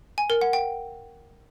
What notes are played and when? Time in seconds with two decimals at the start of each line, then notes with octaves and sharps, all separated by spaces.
0.18 G#5
0.30 A#4
0.41 F#5
0.53 G5